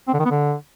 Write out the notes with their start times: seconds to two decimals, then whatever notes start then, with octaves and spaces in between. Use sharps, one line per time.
0.08 C4
0.13 D3
0.19 D#3
0.25 B3
0.31 D3